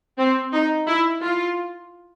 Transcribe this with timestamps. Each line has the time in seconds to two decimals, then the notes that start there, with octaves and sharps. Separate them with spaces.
0.18 C4
0.53 D#4
0.87 E4
1.22 F4